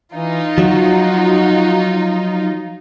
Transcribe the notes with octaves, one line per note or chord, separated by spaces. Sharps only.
E3 D#4 F4
F3 F#3 F#4